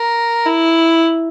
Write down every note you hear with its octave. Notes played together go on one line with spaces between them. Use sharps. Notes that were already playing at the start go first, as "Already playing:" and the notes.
Already playing: A#4
E4